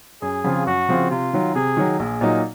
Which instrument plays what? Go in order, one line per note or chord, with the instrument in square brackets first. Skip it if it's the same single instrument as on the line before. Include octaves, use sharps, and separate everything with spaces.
[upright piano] F#2 [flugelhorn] G#4
[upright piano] C#3 F3 C4 F4
[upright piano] F#2 [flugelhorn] F#4
[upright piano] C#3 F3 C4 F4
[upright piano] C3 [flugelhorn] F4
[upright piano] D#3 F#3
[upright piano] C3 [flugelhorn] G#4
[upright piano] D#3 F#3
[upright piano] A#1 [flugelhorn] G#4
[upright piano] A#2 F#3 A#3 D#4